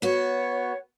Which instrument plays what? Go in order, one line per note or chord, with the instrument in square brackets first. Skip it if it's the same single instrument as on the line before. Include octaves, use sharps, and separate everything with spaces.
[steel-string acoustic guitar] B3 F#4 [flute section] C#5